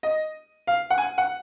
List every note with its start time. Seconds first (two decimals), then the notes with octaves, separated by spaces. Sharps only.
0.03 D#5
0.67 F5
0.90 F#5
0.98 G#5
1.18 F#5